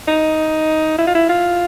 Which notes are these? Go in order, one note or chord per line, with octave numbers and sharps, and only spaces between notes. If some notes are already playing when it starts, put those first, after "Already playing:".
D#4
E4
F4
E4
F4